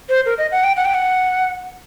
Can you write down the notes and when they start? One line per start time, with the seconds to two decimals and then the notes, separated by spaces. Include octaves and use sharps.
0.09 C5
0.26 A#4
0.38 D#5
0.52 F#5
0.64 G5
0.76 F#5
0.85 G5
0.94 F#5